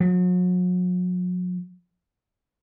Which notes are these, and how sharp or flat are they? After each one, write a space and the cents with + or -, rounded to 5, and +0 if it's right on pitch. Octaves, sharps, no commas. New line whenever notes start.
F#3 -40